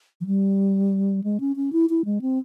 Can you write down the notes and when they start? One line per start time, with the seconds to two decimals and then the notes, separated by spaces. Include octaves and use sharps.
0.21 F3
0.26 G3
1.24 G#3
1.40 C#4
1.56 C#4
1.73 E4
1.90 E4
2.05 G#3
2.21 C4